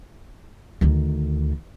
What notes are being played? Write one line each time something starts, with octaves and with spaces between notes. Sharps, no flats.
D2 D#3